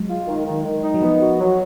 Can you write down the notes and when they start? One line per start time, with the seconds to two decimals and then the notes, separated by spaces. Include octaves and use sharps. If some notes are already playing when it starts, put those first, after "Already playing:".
Already playing: F#3 G#3
0.08 F4
0.27 D#3
0.46 D#3
0.65 D#3
0.83 D#4
0.94 F#3
1.01 F3 B3
1.20 F#4
1.40 F#3